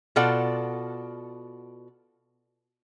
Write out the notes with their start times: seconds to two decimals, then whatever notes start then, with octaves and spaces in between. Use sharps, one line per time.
0.16 B2 F4 A4 D5 F#5